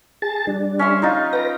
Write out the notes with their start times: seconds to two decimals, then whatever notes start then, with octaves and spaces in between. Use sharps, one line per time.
0.22 G#4 A5 A6
0.47 G3 D4
0.79 C#4 E5 C6
1.02 D#4 F4
1.33 B4 G5 A#6